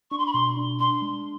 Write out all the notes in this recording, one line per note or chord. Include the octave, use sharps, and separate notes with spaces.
D4 C#6
C6
B5
B2 C6
D4
D4 C6
G#3